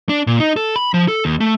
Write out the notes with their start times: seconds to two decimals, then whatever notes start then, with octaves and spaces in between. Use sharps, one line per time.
0.09 D4
0.27 A#2
0.40 D#4
0.56 A4
0.76 B5
0.94 F3
1.08 A4
1.25 D#2
1.40 A3